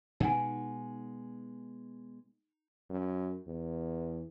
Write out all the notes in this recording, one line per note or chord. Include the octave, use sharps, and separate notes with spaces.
B2 G#3 D#4 F#5 G#5
F#2
E2